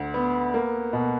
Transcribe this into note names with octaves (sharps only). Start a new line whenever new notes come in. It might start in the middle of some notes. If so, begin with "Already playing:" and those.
Already playing: D2 D3
B3
A#3
B2